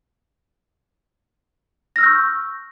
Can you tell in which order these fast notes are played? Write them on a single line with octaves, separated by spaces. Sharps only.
A#6 F6 E6 G6 C#6